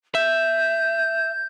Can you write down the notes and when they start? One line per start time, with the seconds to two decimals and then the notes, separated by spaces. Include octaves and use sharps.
0.15 E5 G6